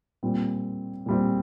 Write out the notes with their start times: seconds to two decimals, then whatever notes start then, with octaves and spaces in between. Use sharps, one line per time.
0.23 A#2 G3 C4
1.06 A#2 G3 C4